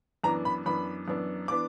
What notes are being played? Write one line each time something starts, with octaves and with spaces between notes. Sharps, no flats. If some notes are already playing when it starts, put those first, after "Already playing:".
F#2 E3 B3 D4 A#5
B5
F#2 E3 B3 D4 B5
F#2 E3 B3 D4
E3 B3 D4 D6